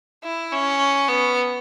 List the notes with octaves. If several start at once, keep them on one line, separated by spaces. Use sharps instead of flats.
E4
C#4
B3